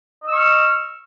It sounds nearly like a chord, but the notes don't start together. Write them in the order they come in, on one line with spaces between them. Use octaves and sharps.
D#5 E6 C#6 F6